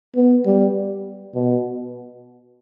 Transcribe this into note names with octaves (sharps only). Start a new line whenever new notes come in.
B3
G3
B2